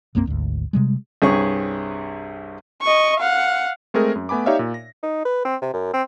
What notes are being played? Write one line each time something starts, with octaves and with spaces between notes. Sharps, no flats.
B1 F#2 A#3 C4
G#1 D2
C3 G3 G#3
C2 G2 G#4 C#5 C#6
D#5 C#6
F5 F#5
G#3 A3 C4 G#4 A#4
F#2
A3 B3 G#5 B5 D6
D#4 G4 C#5 D5 E5 F5
A#2
A#6
D#4
B4
C4
C3
F#2
C4